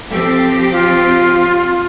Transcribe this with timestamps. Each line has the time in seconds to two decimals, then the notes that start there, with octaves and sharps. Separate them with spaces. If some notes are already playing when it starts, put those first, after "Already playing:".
0.10 F3 C4 G4 A4
0.71 F4